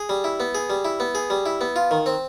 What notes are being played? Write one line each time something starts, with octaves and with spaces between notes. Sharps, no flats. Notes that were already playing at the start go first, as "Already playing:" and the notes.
Already playing: G#4
G3
E4
B3
G#4
G3
E4
B3
G#4
G3
E4
B3
F4
D#3
C4